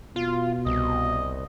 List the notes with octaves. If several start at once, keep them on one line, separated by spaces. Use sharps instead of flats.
B2 F4
C2 D#5